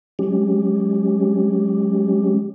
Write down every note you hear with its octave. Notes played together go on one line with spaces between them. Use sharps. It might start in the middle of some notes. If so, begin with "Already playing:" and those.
F#3 G#3 C#4 G4